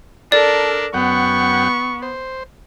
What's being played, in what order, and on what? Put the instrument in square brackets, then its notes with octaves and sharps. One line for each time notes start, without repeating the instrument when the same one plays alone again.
[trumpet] D4 [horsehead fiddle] A4 A#4 [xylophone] D5
[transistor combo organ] F#2 F#5 G5 [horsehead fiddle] B3 [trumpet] C#6
[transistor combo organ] C5